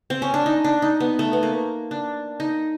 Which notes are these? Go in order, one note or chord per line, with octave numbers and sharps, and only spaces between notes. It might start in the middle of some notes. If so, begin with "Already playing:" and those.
C4
C#4
D4
D#4
D4
D#4
B3
A3
B3
A#3
D4
D#4